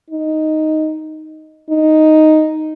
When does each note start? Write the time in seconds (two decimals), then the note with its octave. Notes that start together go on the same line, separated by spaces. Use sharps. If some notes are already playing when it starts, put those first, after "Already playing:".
0.10 D#4
1.69 D#4